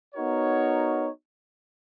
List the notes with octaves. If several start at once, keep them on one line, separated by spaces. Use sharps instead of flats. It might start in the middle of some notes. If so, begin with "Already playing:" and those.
B3 D#4 F#4 A#4 C#5